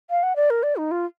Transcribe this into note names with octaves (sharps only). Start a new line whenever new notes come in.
F5
F#5
D5
A#4
D5
D#4
F4